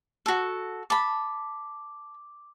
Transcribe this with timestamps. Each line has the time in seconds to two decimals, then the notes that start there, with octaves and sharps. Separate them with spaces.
0.26 F#4 A4
0.90 A5 B5 D6